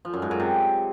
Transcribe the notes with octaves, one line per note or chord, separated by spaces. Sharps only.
F3
F#2
G#2
F#2
C3